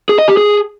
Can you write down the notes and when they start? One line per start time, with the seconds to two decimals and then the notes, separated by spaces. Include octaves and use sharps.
0.09 G#4
0.19 D#5
0.28 G4
0.37 G#4